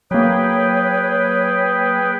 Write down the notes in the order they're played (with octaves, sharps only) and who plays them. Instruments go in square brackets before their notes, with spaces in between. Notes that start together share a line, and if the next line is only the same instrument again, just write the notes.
[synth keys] F#3 A#3 [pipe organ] G#4 B4 G5 [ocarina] C#5